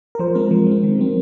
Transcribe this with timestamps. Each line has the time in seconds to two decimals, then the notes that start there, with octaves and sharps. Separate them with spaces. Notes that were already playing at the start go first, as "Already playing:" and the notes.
0.15 A#4
0.19 F3 C5
0.35 G#3 C4 A#4
0.51 F3
0.67 G#3 C4
0.83 D#3
0.99 F#3 C4